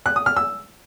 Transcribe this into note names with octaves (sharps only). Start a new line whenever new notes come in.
F#6
D#6
F6
E6